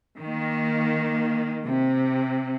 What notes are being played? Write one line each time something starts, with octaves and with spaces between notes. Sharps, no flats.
D#3 A#3
C3